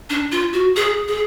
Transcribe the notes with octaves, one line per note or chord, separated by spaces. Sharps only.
D4
F4
F#4
G#4
G#4